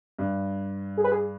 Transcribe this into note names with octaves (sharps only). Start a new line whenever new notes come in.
G2
G#4
B4
G#4